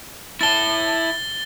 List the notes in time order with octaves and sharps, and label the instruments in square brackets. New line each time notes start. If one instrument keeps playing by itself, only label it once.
[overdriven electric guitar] E4 A5 [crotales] A6 G7